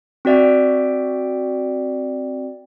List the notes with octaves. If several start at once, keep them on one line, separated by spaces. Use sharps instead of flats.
C4 F#4 D5 E5 G5